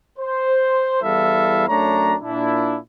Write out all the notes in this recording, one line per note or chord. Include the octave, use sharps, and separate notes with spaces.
C5
E2 G3 E4 A4 E5 F5
F#2 A3 D4 C#5 A#5
A#2 D4 E4